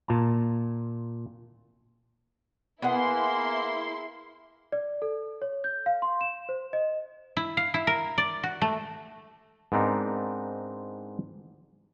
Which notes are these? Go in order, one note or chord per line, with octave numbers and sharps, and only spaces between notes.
A#2 F4 A5 A#5
A#3 B3 E4 G#4 F#5 C6
D5
A4
C#5
G6
F5
C6
E7
C5
D#5
E4
F5
E4
A#4
D5
F#4
A3
G#2 B3 C4 D4 D#4 A#4